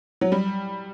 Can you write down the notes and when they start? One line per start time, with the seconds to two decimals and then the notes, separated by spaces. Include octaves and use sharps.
0.21 F#3
0.32 G3